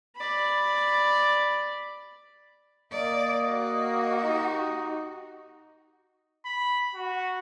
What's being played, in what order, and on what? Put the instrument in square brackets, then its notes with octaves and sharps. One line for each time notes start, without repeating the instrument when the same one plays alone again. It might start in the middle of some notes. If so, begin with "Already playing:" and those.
[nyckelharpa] D5 B5
[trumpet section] A#3 D#5 [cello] D5
[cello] F#4
[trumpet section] D#4 G4
[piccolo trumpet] B5
F#4